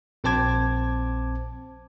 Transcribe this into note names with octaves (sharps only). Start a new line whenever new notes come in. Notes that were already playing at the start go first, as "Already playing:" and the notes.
A#1 C4 C5 A5 D6 G#6